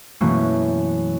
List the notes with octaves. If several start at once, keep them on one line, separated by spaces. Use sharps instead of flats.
F#2 B2 E3 A3 A#3 C#4